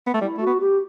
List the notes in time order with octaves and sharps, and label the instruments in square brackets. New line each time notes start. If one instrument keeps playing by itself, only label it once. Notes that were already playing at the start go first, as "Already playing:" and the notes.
[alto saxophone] B3
A3
[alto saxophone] G3 [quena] E4
[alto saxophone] A3 [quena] F#4
[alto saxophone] B3
[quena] G4